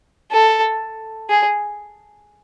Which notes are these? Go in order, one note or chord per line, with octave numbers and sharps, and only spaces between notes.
A4
G#4